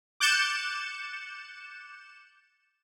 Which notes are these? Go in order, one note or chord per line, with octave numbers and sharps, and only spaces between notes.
D6 F#6 G6 A6 C#7 E7